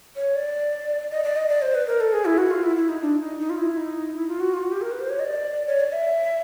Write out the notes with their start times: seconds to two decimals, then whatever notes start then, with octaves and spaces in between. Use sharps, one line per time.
0.16 C#5
0.35 D5
1.11 D#5
1.24 D5
1.37 D#5
1.49 D5
1.62 C5
1.75 B4
1.87 A#4
2.00 A4
2.13 G#4
2.25 E4
2.38 F#4
2.51 F4
2.63 E4
2.76 E4
2.89 D#4
3.02 D4
3.20 D#4
3.40 D#4
3.50 F4
3.58 E4
3.77 D#4
4.15 E4
4.28 F4
4.40 F#4
4.54 F4
4.63 F#4
4.72 G4
4.82 A#4
4.91 B4
5.01 C5
5.10 C#5
5.20 D#5
5.24 D5
5.67 C#5
5.80 D5
5.92 E5